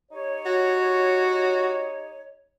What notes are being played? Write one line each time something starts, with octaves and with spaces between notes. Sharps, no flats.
D#4 G4 C#5
F#4